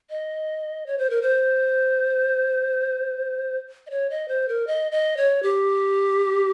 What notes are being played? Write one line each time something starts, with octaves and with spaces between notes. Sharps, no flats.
D#5
C#5
C5
A#4
C5
D#5
C#5
D#5
C5
A#4
D#5
D#5
C#5
G4